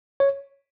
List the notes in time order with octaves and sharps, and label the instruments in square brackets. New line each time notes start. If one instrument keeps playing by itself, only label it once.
[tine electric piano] C#5